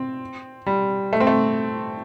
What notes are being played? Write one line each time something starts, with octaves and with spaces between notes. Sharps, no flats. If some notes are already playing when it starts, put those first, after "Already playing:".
Already playing: C4
G3
A3
C4
A3